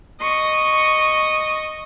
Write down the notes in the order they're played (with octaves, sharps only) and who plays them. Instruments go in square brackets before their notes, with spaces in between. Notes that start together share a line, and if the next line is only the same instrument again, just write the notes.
[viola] D#5 C#6